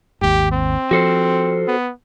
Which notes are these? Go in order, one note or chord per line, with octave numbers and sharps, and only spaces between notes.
G#1 D#2 G#2 G4
C4
F3 F#4 A4 C5
B3